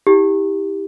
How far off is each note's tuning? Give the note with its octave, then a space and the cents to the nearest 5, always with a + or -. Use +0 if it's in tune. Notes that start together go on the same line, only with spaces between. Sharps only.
E4 -35 G4 +10